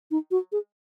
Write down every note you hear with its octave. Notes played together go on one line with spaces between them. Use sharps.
D#4
F#4
G#4